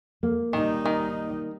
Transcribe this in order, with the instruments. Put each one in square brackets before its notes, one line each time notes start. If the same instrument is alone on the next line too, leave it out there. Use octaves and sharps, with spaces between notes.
[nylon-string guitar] A#3
[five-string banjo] D#3 [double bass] G3 D#4
[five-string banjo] D#3